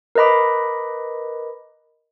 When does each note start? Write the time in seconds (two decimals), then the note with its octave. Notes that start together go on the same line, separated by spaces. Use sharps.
0.15 A#4 B4 D#5 B5 D6